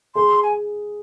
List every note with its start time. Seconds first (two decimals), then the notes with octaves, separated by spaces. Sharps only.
0.15 G#4 C6
0.43 G#5